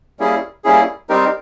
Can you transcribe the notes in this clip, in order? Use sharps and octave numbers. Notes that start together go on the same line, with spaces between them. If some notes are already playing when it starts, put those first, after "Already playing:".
G3 A#3 C#4 E4 G#4
G3 A#3 C#4 E4 G#4
G3 C4 D#4 G4 A#4